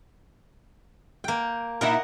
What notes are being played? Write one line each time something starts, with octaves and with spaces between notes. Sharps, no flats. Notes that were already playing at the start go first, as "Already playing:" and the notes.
A#3 G5
A#2 D#4 E4 A#4 D#5 F#5